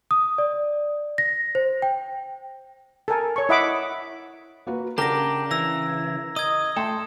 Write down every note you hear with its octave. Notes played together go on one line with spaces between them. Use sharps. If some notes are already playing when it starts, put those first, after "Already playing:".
D#6
D5
A#6
C5
G5
A4 A#4 G#5
C#5 C#6
E4 D#5 E5 F#5 B5 D6
A#3 F#4 B4
C#3 D4 G4 A#4 F#5 A#5 A#6
E3 E6 A#6
D#5 D#6 G#6
A3 A4 G5 A5 C6